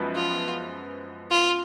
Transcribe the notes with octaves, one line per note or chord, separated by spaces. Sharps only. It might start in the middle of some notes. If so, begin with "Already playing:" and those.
Already playing: F#2 F3 G#3 B3
F4
F4